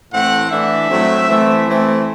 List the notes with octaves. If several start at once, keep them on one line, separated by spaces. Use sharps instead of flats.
A2 E3 A3 C4 F#5
E3 A3 D4 E5
A2 F#3 A3 C4
E3 A3 C4
E3 A3 C4